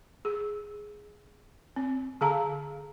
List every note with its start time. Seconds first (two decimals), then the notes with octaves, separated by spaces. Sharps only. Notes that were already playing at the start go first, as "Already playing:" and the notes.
0.25 G#4
1.76 C4
2.21 D3 G#4 F5 A#5